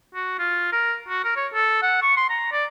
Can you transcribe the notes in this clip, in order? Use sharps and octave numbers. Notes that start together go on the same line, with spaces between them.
F#4
F4
A#4
F#4
A#4
C#5
A4
F#5
C#6
C6
A#5
D5